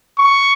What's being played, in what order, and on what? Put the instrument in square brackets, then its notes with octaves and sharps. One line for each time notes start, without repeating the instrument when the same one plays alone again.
[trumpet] C#6